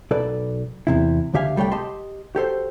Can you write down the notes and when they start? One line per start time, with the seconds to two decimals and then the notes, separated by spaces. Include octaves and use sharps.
0.11 B1 A4 B4 D5
0.87 E2 C3 E4
1.34 C#2 D3 G4 E5 F5 G#5
1.56 C2 G3 A3 C#5 G5
1.72 G4 D#5 A5 C6
2.35 F#4 G4 A4 C5